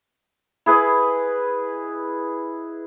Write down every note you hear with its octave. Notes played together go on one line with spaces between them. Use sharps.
E4 G#4 B4 D#5